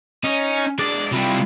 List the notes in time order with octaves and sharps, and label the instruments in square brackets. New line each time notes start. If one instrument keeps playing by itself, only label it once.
[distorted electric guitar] C#4 [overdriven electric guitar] D#4
[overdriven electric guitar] G#3 D4 [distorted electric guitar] D5
[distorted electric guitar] C3 G3 [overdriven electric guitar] E4 F4